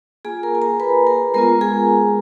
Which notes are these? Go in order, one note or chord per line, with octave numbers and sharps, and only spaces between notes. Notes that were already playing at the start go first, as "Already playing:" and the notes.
A#3 F4 G#4 G#5
A#4 A#5
G#5
A#4 A#5
B4 B5
A#4 A#5
G#3 B3 F4 A#4 A#5
G#4 G#5